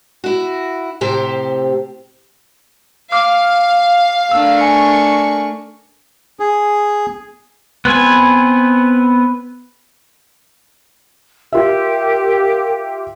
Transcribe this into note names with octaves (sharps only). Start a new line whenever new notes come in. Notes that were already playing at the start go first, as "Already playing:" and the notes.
E4 F#4
A2 C3 G4 C5
F5 D6 F6
A3 D4 A#4 E6
G#5 C#6
G#4
B3 C4 B4 G#5
F4 G4 A#4 E5